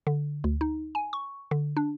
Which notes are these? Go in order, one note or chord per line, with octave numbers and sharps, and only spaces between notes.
D3
D2
D#4
G#5
C#6
D3
D4